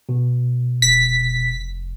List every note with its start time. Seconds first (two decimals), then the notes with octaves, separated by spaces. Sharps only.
0.09 B2
0.82 F1 B6